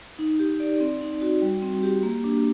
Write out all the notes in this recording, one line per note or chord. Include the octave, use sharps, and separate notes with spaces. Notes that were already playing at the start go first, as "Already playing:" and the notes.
D#4
G4
D5
C4
D#4
F#4
G3
C4
G4
A#3
D4